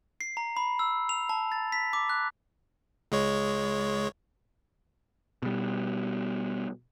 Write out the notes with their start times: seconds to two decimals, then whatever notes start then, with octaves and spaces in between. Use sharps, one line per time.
0.21 C7
0.37 A#5
0.57 B5
0.79 E6
1.09 F7
1.29 A5
1.52 A6
1.72 B6
1.93 D6
2.09 F#6
3.12 C#2 G#3 C#5
5.43 B2 G3